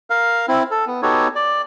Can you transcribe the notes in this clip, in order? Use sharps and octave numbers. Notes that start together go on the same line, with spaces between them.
A#4 F5
C4 E4
A4
B3
B3 D#4 F#4 G4 A4 C#5
D5